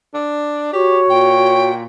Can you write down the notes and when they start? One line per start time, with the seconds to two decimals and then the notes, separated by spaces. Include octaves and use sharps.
0.14 D4
0.73 F#4 G4 C#5
1.10 A#2 G5